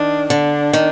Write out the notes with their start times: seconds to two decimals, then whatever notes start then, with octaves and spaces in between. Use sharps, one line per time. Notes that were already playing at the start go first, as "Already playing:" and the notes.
Already playing: D#3 D4
0.30 D3 D4
0.73 D#3